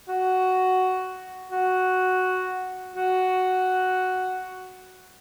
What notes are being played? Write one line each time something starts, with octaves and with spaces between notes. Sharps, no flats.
F#4
F#4
F#4